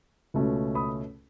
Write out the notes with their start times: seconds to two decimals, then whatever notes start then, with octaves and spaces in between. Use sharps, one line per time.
0.34 C#2 B2 A3 C#4
0.75 B5 D#6